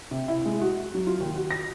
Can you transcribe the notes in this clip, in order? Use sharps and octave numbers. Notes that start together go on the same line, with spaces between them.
C3
E4
G#3
F#4
F#3
F4
D#2
F#4
A#6